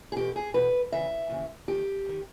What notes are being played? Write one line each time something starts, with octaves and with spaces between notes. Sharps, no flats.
G#4
E2 B2 G4
G#4
E2 B2 B4
D#2 C#3 E3 E5
D#2 C#3 E3
D#2 D#3 G4
D#2 D#3